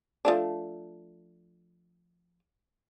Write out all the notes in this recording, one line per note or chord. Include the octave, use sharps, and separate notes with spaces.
F3 A3 D4